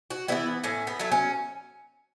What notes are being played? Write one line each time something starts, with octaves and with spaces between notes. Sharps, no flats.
F#4
E3 G#3 B3 E4
A2 C#4
B3
F#3 A3
C#4